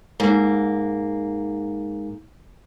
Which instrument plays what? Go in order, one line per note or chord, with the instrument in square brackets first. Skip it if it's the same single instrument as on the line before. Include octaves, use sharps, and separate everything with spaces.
[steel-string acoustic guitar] G#2 A#3